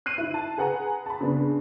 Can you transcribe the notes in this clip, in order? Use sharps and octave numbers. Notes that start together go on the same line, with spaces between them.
F#6 C7 D#7
D#4 E4
A5
G#4 B4 F#5 G#5 A#5
A5 B5
C#3 B3 D4